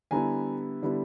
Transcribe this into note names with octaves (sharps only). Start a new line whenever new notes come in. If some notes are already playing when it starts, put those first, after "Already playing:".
D3 G3 B3 E4 G#5 A#5
D3 G3 B3 E4